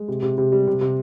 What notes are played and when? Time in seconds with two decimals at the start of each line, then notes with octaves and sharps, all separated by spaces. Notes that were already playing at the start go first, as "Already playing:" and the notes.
Already playing: G#3
0.08 C3
0.22 C3
0.38 C3
0.52 G3
0.67 C3
0.81 C3